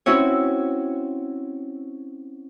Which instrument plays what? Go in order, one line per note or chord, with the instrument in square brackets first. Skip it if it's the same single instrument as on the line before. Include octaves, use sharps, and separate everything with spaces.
[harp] C4 C#4 E4 F#4 C#5